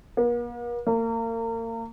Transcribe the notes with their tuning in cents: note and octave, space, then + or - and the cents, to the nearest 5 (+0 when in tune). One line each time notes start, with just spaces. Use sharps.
A#3 +45
A#3 -35